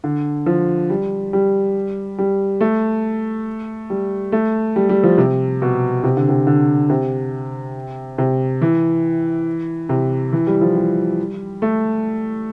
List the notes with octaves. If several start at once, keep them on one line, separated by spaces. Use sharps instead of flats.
D3
F3
G3
G3
G3
A3
G3
A3
G3
G3
F3
C3
B2
C3
D3
C3
D3
C3
C3
E3
C3
E3
G3
F3
G3
A3